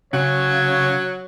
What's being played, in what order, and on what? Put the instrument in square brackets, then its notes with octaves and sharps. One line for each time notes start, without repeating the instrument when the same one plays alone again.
[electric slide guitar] C#3 [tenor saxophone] F#3 [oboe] C#5